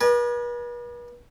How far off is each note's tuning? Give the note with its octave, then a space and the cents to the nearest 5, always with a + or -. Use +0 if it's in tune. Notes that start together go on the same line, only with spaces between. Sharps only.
B4 -40 D5 +45 G#5 +20